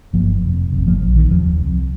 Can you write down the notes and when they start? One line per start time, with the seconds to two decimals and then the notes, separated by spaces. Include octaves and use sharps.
0.13 G1 G2 F3 A#3
0.43 F1 F2 C3
0.72 G1 F2 C3
0.87 F3 A#3
1.01 A#2 F3
1.05 A#1
1.16 D#3
1.31 F1 D#2 F3
1.60 C2 C3